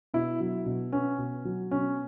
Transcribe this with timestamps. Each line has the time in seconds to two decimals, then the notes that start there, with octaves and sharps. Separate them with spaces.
0.14 B2 E4
0.40 F#3
0.66 B2
0.92 B3 C#4
1.18 B2
1.45 F#3
1.71 B2 C#4